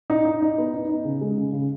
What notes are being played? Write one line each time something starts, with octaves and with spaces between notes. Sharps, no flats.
D#4
D#4
D#4
B3
D#4
D#4
C#3
G#3
C#3
C#3